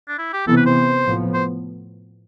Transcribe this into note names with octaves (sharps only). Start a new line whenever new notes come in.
D4
E4
G4
C3 E3 B3 A4
B4
C5
A2 F3 B3
C5